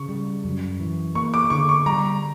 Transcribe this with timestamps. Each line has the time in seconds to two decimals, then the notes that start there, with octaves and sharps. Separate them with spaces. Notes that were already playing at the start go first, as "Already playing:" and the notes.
Already playing: C#3 C#6
0.09 G3
0.44 F#2
0.80 E3
1.15 A#3 C#6
1.34 D6
1.50 D3 C#6
1.69 C#6
1.86 G3 A#5